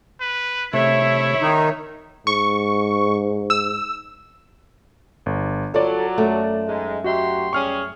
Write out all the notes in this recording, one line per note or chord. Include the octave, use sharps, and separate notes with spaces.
B4
C3 A3 E4 C#5 E5
D#3 D#4
G#2 C#6
E6
G1
F#3 F4 A4 C#5 D5
F#2 A3
G#2 G#3
F#3 F#4 G4 D#5 E5 C6
G3 C#4 G#4 C#6 F6